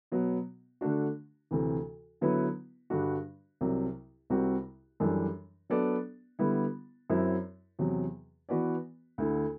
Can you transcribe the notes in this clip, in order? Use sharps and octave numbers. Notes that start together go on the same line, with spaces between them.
B2 F#3 B3
D3 A3 D4 F#4
D2 C3 E3
D3 F#3 B3 E4 B4
G2 D3 G3 D4 F#4
C2 C3 F#3
C2 C3 G3 C4 F#4
F#2 E3 G3 D4 A4
F#3 B3 D4 A4 D5
D3 G3 B3 E4
F#2 F#3 C4 E4
E2 C3 F#3
E3 B3 F#4 B4 D5
D2 D3 A3 E4